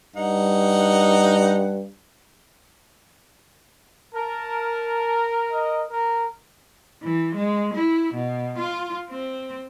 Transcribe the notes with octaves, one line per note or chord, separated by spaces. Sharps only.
G2 D#4 F#5
A#4 A5
D#5
A#4
E3
G#3
E4
B2
F4
C4